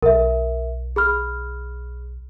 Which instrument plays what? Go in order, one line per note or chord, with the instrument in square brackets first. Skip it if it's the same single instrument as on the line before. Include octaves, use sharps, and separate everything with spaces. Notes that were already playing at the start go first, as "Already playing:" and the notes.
[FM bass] B1 [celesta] A#4 E5
[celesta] G#4 B5 F6